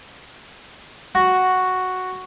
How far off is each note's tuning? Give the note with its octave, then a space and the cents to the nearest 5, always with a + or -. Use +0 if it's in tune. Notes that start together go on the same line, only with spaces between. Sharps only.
F#4 +0